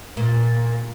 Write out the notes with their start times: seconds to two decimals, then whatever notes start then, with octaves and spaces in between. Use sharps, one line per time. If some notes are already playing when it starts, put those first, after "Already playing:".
0.17 A#2